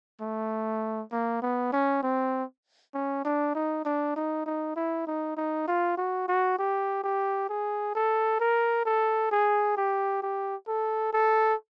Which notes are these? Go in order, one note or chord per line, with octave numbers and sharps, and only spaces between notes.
A3
A#3
B3
C#4
C4
C#4
D4
D#4
D4
D#4
D#4
E4
D#4
D#4
F4
F#4
F#4
G4
G4
G#4
A4
A#4
A4
G#4
G4
G4
A4
A4